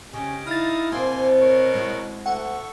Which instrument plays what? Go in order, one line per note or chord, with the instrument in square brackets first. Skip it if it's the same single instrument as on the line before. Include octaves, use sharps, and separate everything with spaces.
[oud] C#3 [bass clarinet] C#4 [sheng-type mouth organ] G4 D#5
[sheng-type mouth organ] D#4 F5 D#6 [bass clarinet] E4 [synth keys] F6 A6
[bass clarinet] B2 [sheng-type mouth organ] A#3 G#5 C6 [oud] C4 E4 F#4
[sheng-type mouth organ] A#4 C#5
[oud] G#3 E4 F#4
[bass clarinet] D2 [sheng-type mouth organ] A4 C#6 [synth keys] F#5